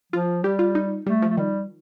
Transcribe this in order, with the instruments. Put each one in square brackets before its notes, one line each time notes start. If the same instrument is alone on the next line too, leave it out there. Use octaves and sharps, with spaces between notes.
[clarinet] F3 [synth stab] F4
[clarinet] G3 [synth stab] G4
[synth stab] F4
D#4
[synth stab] G3 [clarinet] A3
[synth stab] F3
[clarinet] A3
[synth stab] D#3 [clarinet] G3